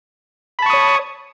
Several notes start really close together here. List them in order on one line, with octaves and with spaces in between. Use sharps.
B5 A5 C#6 D#6 C#5